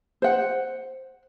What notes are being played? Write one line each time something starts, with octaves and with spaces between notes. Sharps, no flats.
C5 F#5